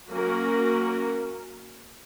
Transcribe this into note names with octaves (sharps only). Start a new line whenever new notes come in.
F#3 A#3 C#4 F#4 A#4